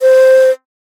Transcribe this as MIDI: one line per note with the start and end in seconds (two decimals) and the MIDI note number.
0.02 0.51 72